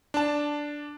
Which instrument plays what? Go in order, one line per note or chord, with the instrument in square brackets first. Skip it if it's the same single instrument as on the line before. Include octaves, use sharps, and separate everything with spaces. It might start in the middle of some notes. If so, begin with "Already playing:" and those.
[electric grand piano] D4 A5